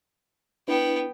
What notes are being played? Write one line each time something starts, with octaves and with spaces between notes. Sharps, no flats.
B3 D4 E4 B4 G5